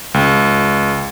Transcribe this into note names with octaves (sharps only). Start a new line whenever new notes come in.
C#2